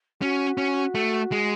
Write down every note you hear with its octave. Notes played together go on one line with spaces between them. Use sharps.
C#4 F#4
C#4
A3
G#3